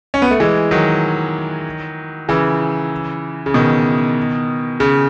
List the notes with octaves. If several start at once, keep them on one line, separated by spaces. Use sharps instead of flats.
C#4
B3
A3
E3 G#3
D#3 F#3
C#3 E3
C#3
B2 D#3
C#3